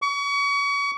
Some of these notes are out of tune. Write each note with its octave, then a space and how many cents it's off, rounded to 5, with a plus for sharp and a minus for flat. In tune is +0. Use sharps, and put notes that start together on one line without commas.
C#6 +35